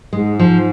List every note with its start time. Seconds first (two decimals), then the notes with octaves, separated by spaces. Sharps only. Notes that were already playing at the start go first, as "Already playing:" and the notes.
0.13 G#2 G#3
0.39 F3